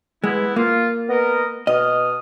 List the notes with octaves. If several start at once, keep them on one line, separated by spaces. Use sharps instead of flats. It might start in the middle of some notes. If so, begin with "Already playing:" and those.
G#3 B3 E4
A#3 F4
B3 A#4 D#5
B2 D#5 D#6 F6